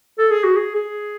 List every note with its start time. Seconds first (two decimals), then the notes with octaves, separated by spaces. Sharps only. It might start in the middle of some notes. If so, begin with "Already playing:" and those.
0.18 A4
0.31 G#4
0.44 F#4
0.56 G#4
0.76 G#4